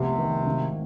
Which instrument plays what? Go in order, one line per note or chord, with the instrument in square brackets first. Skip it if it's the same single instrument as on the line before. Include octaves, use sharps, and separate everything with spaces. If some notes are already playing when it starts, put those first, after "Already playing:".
Already playing: [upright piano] F1 C2 B3 [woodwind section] C3
[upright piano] D#3
G#1